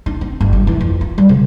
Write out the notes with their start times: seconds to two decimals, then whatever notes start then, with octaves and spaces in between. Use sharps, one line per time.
0.06 D4
0.21 C4
0.41 G1
0.53 G2
0.67 E3
0.81 F2
1.01 F4
1.18 G3
1.29 C#3